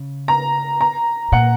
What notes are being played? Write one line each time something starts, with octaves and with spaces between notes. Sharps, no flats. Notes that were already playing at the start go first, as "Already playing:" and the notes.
Already playing: C#3
A#5
A#5
A#2 F#5